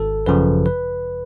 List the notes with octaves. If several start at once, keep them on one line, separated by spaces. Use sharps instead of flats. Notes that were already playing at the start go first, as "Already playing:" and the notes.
Already playing: G#1 A4
F#2 C#3 F3 B4
B4